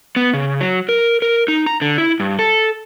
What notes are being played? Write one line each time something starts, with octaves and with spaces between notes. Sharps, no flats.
B3
C#3
F#3
A#4
A#4
D#4
A#5
D3
E4
G2
A4